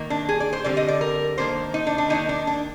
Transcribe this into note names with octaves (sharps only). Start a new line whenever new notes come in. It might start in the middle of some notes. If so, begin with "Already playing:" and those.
Already playing: D#3 A#3
D4
G#4
D5
C5
D3 G3 C4 D5
D#5
D5
A#4
D#3 A#3 D4 C5
D#4
D4
D4
D#3 A#3 D4 D#4
D4
D4